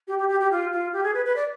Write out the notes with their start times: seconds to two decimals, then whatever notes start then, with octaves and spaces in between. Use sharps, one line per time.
0.07 G4
0.18 G4
0.28 G4
0.40 G4
0.51 F4
0.72 F4
0.93 G4
1.03 G#4
1.14 B4
1.25 B4
1.36 D5